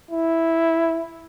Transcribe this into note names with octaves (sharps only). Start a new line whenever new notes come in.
E4